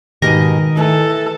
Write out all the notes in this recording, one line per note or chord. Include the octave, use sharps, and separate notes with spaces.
G#2 B2 D#3 G4 A#4 D#5
E3 A3 A4